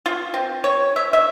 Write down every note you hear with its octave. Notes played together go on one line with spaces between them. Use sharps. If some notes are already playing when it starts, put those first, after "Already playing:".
F4
C4
C#5
E5
E5